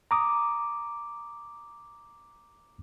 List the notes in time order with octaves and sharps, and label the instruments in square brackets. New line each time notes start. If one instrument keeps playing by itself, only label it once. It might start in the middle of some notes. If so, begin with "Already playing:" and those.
[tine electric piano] A#5 D6 D#6